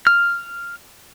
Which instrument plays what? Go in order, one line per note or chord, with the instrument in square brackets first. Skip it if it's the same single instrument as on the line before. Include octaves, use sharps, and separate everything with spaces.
[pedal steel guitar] F6